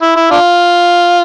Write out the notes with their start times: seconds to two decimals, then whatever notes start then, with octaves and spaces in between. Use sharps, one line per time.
0.02 E4
0.16 E4
0.31 D4 F4